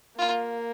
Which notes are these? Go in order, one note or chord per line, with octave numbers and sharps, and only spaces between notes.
A#3 F4